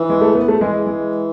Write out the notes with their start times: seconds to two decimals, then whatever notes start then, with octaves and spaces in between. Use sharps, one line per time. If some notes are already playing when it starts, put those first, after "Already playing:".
Already playing: E3
0.10 G#3
0.21 A3
0.35 B3
0.48 A3
0.61 E3 G#3
0.86 G#3